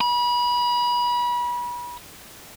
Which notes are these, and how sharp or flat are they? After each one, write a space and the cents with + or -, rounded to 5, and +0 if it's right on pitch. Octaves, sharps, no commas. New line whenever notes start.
B5 -30